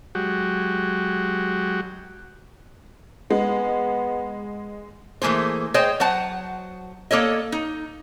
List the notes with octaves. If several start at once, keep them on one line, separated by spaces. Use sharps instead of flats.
F#3 G#3 F#4 G4
G#3 B3
E3 A3 A#3 G#4 C5
G#4 C5 C#5 D#5 G5
F#3 C5 F#5 A5
A#3 A4 C#5 D#5
D#4